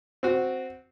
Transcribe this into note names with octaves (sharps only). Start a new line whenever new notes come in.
C4 F#4